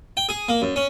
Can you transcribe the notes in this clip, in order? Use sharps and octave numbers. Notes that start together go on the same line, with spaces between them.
G5
G#4
A#3
F#2
C#4